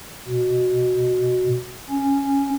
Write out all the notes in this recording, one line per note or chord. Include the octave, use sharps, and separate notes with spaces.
B2
C#4